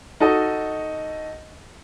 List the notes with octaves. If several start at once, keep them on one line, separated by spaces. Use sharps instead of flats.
D#4 F#4 A4 D#5